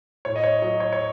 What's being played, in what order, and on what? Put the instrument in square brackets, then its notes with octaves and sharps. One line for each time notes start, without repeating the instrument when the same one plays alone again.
[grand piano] A2 C#5
D#5
C#5
F#3 D#5
C#5
C#5